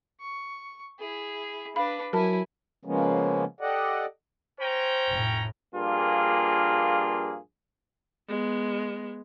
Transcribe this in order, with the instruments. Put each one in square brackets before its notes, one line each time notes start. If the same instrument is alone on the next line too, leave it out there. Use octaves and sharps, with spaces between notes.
[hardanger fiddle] C#6
E4 G#4
[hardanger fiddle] D4 B4 [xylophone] F5 B5
[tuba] F#3 [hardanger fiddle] E4 G#5 [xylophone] A#4 A5
[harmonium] C#3 F3 G#3 A#3 B3 C#4
G4 A4 D5 D#5 F#5
[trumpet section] C#4 G5 A#5 [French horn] C5
[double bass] F1 A2
[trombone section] A#1 G2 A#3 F4 G#4
[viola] G#3 B3